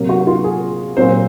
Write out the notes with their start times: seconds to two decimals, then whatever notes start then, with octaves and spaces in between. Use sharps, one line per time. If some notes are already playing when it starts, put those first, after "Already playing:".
Already playing: C3 F#3 A#3
0.09 F#4
0.27 F4
0.44 G#4
0.97 A#2 F#3 C4 C5